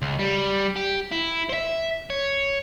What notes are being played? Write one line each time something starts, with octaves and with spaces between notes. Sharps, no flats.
C#2
G3
G4
E4
C5 E5
C#5